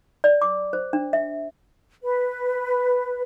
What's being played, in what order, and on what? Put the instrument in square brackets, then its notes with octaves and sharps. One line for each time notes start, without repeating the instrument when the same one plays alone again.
[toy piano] D5
D6
C5
D4
E5
[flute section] B4